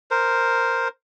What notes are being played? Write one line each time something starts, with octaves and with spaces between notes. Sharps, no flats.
A#4 C5